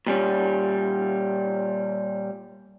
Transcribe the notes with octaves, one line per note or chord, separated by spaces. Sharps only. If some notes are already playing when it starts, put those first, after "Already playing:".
A#2 G3 C#4